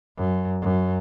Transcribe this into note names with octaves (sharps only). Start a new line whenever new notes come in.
F#2
F#2